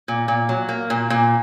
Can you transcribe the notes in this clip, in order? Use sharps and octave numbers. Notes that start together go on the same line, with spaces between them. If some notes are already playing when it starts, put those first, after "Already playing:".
A#2
A#2
F#3
A#3
A#2
A#2